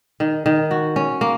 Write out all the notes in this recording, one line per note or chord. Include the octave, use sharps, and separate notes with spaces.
D#3
D#3
F#4
C#4
A#3